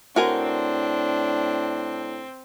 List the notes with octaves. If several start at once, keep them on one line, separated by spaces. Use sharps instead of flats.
A2 C4 D4 F#4 A#4 G#5